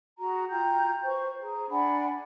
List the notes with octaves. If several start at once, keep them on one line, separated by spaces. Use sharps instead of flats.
F#4 G#4 A#5
F4 G5 A#5 G6
B4 C5 C#6
G#4 A#5
D4 F#5 G#5 B5